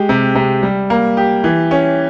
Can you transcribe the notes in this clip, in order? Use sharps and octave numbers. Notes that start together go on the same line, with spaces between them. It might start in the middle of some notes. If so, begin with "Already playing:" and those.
Already playing: G#3 G4
C3
C3
G3
A#3
G4
E3
C#4